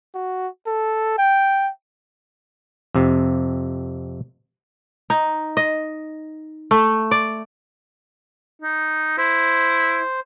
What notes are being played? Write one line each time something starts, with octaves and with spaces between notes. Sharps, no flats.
F#4
A4
G5
F2 C3
D#4
D#5
A3
D5
D#4
E4 C5